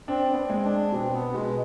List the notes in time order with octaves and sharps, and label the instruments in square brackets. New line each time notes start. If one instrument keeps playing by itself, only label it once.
[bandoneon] C4 [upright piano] D4
[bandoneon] B3
C4
[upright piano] G#3
[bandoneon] D4
[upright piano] B2 [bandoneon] C4
[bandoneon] B3
[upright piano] B2 [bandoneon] G#3